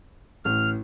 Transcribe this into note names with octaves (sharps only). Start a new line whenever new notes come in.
A1 F6